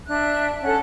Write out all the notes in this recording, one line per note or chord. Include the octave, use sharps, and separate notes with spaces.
D4 E5 F#6
C#4 A4 F#5 F#6